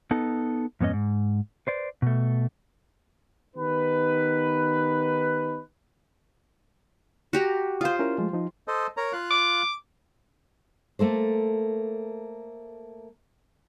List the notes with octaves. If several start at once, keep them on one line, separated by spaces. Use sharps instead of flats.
B3 D#4 A4
F2 G#2 B3 C#4 D#5
G#2
B4 C5 D5
B2 A3
D#3 B3 D#4 G4 B4
F#4 G4 A#5
F4 C5 F5 D#6
C#4 E4 A#4
F3 G#3 A3
F3 D#4
A4 C5 D#5
A#4 C#5 A#5
F4 F5 F#6
D6
A3 A#3 A4 C5